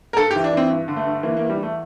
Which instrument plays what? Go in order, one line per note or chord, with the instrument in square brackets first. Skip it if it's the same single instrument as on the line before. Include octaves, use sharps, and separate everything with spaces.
[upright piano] A#4
G2 A4
G4
E3
D4
E3 C4
G2
D3
A3
G2
E3 A#3
E2 A#3
G3
E3
A3